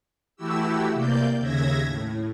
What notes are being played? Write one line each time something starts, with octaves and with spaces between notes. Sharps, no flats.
E3 A3 E4 F#4 G4 E6
C3 A#3 D5 G6
D#2 C#3 E5 G#6 A#6
A2